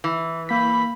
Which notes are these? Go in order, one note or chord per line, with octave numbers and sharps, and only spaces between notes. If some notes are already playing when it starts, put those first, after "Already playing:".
E3
A#3 B5 B6